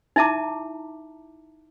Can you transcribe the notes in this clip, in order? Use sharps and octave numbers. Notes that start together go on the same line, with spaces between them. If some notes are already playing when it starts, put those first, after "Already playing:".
D#4 E4 E5 A5 A#5 D6